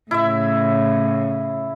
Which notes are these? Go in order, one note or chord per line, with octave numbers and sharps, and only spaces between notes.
A2 C#3 E4 E5